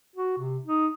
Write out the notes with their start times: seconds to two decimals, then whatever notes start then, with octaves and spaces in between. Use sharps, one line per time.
0.16 F#4
0.38 C3
0.65 D#4